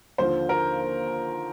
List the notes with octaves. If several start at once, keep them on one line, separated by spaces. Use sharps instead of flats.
D#2 D3 F3 C5
A#4